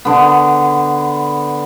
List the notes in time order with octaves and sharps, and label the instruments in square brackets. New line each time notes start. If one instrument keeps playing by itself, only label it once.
[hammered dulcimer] D3 B3